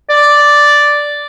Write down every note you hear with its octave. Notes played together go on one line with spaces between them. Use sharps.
D5